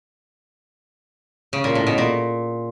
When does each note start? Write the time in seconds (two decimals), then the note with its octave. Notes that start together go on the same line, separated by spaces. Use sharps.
1.53 C#3
1.64 A#2
1.75 A2
1.87 B2
1.98 A#2